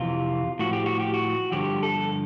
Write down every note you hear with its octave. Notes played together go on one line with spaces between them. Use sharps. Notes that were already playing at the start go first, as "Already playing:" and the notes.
Already playing: F2 C3 E3 F4
A2 F3 F#4
G4
F#4
G4
F#4
G2 D3 F3 G4
A4